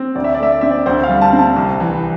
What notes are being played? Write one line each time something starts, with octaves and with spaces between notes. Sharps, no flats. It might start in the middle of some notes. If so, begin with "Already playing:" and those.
Already playing: C4
D2 D5
E5
D5
A3 E5
D5
C4 E5
D5
D2 C5
F5
G3
A5
C4
A5
C2
E3